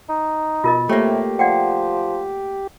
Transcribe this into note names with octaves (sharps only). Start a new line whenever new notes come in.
D#4
B2 F4 A#4 D#5
C3 A3 A#3 G4 C#5
F3 D5 F#5 G5